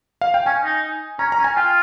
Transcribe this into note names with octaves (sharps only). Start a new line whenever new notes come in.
F5
G5
C#4 G#5
D#4
C#4 A#5
A#5
C#4
G#5
F4 G5